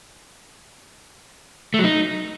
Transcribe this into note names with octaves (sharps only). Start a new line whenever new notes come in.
A3
F#3
D#4